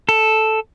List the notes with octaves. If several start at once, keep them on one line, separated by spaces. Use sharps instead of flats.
A4